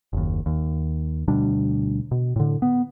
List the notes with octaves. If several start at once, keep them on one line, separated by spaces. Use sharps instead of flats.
F#1 D#2
D#2
D2 B2 G3 D4
B2
A2 D3
B3